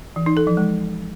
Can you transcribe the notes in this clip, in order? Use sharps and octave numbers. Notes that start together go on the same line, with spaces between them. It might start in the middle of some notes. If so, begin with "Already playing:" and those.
E3
D#4
A4
F3
G#3